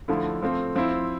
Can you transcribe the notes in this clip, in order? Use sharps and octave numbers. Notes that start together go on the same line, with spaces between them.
D3 F3 A3 E4
F3 A3 C4
F3 C4 E4